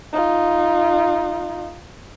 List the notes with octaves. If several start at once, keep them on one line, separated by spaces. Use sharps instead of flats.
D#4 F4